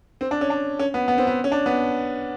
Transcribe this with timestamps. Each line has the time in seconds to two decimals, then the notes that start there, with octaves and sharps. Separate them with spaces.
0.21 C4
0.31 D4
0.41 C#4
0.50 D4
0.79 C#4
0.94 B3
1.08 B3
1.18 C4
1.27 B3
1.44 C#4
1.52 D4
1.66 B3